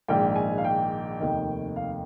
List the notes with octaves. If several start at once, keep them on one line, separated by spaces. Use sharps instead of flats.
A#1 G#2 D#3 G5
G#5
F5
G5
F1 D#2 D#3
F5